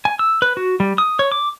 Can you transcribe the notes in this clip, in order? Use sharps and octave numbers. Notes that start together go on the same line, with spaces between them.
G#5
E6
B4
F#4
G3
D#6
C#5
D6